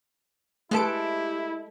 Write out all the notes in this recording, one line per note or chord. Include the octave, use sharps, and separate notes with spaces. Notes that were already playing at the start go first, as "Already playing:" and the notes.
G#3 A3 E4 G4 A4 B4 A5 D7